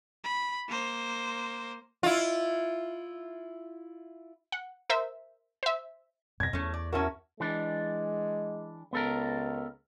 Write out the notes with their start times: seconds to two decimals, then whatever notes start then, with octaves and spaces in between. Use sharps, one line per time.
0.24 B5
0.68 A#3 C5
2.03 E4 F4
4.52 F#5
4.90 A#4 C5 E5
5.63 C5 E5
6.40 F2 B2 G#6 A#6
6.53 E2 A3 C#4
6.74 D5
6.92 C#4 E4 F#4 A#4 A5 C#6
7.40 E3 G#3 D4
8.93 C#2 B3 A4 A#4